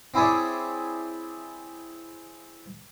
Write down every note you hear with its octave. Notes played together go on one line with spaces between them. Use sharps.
C4 E4 G#4 C#5 D5